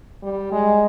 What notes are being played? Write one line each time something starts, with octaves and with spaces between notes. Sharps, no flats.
G3
G#3